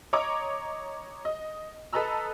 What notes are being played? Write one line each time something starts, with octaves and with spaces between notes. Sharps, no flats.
C#5 D#5 A#5 D6
D#5
A4 B4 D#5 A#5 E6